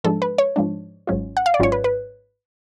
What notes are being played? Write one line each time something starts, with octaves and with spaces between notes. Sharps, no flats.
G#2 F3 G#3 D4 A4
B4
C#5
G#2 F3 G#3 D4
G#1 G#2 F#3 C#4 F4
F#5
F5
D5
G#1 G#2 F#3 C#4 F4 C#5
B4
B4